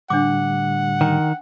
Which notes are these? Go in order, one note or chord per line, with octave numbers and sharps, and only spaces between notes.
A2 D3 G3 D4 F#5 D6
D#3 G5